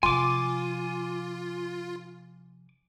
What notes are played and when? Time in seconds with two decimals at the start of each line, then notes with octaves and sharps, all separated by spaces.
0.03 C3 F3 F4 G#5 C6 D6